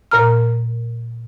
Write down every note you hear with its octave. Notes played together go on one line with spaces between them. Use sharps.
A#2 A#4 A#5 F6